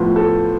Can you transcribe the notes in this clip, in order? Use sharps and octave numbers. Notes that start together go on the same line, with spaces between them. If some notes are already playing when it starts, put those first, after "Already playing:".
Already playing: A2 F3 B3 F4
A4